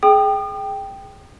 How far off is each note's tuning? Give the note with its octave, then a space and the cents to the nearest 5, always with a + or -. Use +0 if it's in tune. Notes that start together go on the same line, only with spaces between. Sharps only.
G#4 +15 G5 +0 D#6 -40